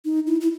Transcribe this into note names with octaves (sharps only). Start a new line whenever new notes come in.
D#4
E4
E4